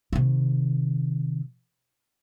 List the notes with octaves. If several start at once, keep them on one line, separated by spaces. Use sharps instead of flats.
C3 D#3